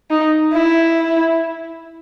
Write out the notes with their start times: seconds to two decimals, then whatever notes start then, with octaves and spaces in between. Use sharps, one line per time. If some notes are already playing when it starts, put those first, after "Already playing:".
0.11 D#4
0.54 E4